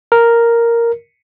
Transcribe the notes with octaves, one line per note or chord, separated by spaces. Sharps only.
A#4